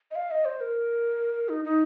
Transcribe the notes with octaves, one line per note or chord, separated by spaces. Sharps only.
D#5
F5
D#5
C5
A#4
D#4
D#4